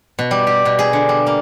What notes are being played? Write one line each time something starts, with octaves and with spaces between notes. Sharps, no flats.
B2
G3
G4
B2
G#4
D3
G3
A#3